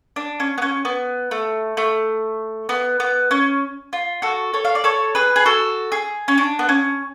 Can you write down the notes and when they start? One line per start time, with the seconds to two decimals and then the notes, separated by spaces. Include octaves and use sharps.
0.16 D4
0.40 C#4
0.58 B3
0.62 C#4
0.85 B3
1.31 A3
1.77 A3
2.69 B3
3.00 B3
3.31 C#4
3.93 F4
4.22 F#4 A4
4.54 A4 C#5
4.65 F5
4.75 D5
4.84 A4 C#5
5.15 G#4 B4
5.36 G#4
5.45 F#4 A4
5.92 G#4
6.28 C#4
6.38 D4
6.59 B3
6.69 C#4